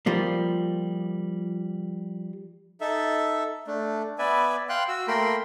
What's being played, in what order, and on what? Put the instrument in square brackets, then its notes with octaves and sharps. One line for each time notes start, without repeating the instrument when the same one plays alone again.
[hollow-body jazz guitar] F3 G3 A#3
[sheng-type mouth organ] D#4 A4 E5
A3 D4
B3 B4 D5 E5 G#5
F5 G5 C6 F#6
F#4 E6
A3 A#3 A#4 G5 B5 C6